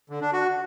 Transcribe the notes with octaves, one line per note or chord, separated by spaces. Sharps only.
D3
D4
F#4